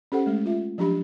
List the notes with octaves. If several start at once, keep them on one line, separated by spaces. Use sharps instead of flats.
C#4 G4 A4 C5 F#5
G#3 A3
F4 E5
F3 F#3 D4 G4 B5